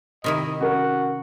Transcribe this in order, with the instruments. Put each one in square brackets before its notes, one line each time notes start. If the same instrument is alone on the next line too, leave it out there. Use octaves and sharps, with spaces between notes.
[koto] C3 D#3 E4 [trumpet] D#5
[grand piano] C#4 A#4 [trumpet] F#4